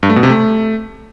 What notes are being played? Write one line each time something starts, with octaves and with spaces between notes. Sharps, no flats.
G2
A3
B2
C3
A3